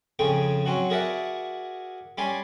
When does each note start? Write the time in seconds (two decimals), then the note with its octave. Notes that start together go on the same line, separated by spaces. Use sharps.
0.19 F2 C#3 G#4 C#5 G5
0.66 F#3 C4 C#4 F#4
0.90 F#4 G#4 A#4 D5 E5 F#5
2.18 G3 C#4 D5 G#5 C6